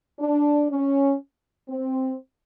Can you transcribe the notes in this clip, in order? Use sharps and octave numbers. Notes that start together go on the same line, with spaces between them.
D4
C#4
C4